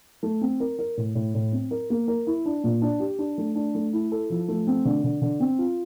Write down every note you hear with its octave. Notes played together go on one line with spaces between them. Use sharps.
A3
C4
A#4
A#4
A2
A2
A2
C4
A#4
A#3
A#4
E4
D4
A#2
D4
G4
D4
A3
D4
A3
E4
A4
F3
A3
C4
D3
D3
D3
C4
F4